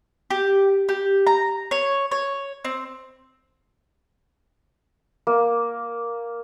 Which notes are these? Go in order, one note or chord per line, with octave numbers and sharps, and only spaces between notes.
G4
G4
A#5
C#5
C#5
C4
A#3